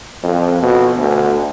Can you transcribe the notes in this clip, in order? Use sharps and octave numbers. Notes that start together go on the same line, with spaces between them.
F2
B2
D2